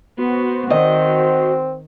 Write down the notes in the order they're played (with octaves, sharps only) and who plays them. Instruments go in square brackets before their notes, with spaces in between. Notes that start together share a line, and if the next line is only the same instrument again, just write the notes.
[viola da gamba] B3 [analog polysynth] F#4 C5 C6
[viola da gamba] D#3 [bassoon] C4 [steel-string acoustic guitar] D#5